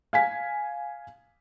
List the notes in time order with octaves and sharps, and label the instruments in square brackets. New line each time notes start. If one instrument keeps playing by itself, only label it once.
[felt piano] F5 G#5 B6